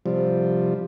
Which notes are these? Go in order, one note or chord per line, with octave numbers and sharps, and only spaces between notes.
C3 F3 G3